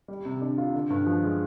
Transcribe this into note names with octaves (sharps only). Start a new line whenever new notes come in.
G3
C3
D4
F4
D3
G2
F3
G#3